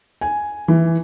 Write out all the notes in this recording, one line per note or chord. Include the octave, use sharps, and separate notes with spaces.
G#5
E3